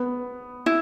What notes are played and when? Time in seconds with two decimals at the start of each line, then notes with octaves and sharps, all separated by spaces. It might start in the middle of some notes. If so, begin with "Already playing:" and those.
Already playing: B3
0.66 E4